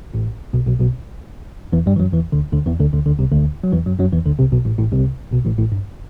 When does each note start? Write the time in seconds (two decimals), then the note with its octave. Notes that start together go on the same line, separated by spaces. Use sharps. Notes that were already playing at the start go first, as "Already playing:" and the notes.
0.14 A1 A2
0.53 B1 B2
0.67 B1 B2
0.79 B1 B2
1.73 E2 E3
1.86 G2 G3
1.96 E3
2.00 F#2 F#3
2.13 E2 E3
2.32 D2 D3
2.52 D2 D3
2.66 E2 E3
2.79 D2 D3
2.93 D2 D3
3.06 D2 D3
3.19 C2 C3
3.32 D2 D3
3.63 F#3
3.73 E2 E3
3.86 F#2 F#3
3.99 F#2 F#3
4.13 E2 E3
4.25 D2 D3
4.39 C2 C3
4.52 B1 B2
4.65 A1 A2
4.78 A1 A2
4.92 C2 C3
5.32 B1 B2
5.46 A1 A2
5.58 A1 A2
5.72 G2